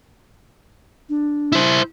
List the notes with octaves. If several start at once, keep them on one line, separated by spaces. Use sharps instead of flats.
D4
E4 C5